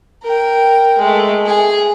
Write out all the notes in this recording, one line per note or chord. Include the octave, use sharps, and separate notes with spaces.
A#4 G5
G#3 A3
G#4 G#5